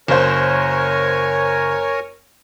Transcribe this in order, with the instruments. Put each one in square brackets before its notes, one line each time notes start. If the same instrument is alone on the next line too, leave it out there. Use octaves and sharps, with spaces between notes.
[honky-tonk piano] F#1 C5 [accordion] A#4 C#5 G#5